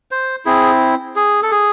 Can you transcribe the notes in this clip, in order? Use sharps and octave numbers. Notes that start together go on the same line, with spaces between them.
C5
C4 E4 G#4
G#4
A4
G#4